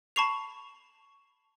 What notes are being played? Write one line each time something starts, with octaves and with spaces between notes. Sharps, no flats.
A5 B5 C#6 C7 F7